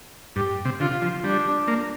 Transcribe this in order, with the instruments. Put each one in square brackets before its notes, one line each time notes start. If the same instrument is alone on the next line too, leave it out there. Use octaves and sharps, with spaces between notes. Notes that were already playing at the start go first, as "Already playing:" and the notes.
[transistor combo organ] G2 [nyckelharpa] G4
[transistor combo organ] C3
[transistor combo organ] D3 [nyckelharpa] F4
[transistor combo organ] F3
[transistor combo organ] G3 [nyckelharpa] D4
[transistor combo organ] A#3